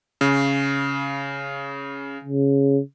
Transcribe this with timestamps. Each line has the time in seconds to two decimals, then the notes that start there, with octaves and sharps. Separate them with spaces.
0.21 C#3
2.24 C#3